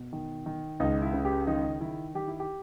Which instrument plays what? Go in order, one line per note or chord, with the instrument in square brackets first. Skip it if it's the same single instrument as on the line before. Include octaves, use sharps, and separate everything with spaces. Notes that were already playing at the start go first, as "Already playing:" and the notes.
Already playing: [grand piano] B2
D#3
D#3
C#2 D#4
E4
C#3
G4
D#3 D#4
D#3 E4
D#3 G4
E4
G4